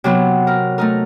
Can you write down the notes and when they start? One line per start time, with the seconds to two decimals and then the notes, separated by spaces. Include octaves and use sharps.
0.04 C3 F#3 B3
0.47 A#4
0.78 A3 D#4 A#4